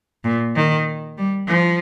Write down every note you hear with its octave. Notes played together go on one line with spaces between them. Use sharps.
A#2
D#3
G3
F3